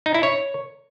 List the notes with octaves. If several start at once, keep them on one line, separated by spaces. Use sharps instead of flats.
D#4
E4
C#5